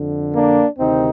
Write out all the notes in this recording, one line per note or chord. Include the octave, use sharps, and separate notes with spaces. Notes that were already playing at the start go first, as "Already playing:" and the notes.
Already playing: F2 D3
A#3 D4
D2 C3 D#3 C4 D#4